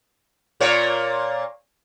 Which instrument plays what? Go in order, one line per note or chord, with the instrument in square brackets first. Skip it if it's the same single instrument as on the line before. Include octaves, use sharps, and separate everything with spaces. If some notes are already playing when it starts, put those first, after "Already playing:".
[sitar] A#2 A#3 C#5